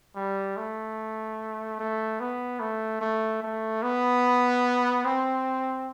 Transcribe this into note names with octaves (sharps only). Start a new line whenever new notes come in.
G3
A3
A3
B3
A3
A3
A3
B3
C4